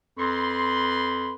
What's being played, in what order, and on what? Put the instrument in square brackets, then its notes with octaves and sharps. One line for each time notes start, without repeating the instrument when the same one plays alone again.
[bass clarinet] F2 [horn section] B4 B5 C6